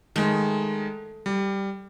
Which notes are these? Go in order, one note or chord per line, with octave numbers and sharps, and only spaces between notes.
D#3 G#3 A3
G3